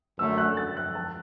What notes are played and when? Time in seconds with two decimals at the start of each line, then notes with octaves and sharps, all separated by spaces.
0.19 F#2 D3 A3 E6
0.38 F#6
0.57 A6
0.77 F#6
0.95 A5